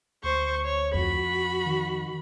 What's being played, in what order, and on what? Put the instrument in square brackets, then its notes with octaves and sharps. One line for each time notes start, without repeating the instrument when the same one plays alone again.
[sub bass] D2 [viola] C5 C#6
[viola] C#5
[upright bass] F2 [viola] F#4 B5
[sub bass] D#3